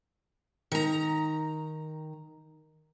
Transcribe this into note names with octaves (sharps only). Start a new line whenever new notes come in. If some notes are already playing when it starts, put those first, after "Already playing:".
D#3 A#5